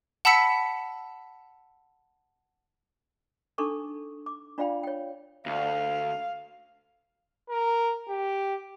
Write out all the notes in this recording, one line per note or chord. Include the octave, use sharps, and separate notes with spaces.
F#5 A5 B5 E6 B6 C#7
D4 D#4 A4 C#6 D6
D6
D4 F4 D5 F5 G5 B5
C#5 G5
D2 F5
A#4
G4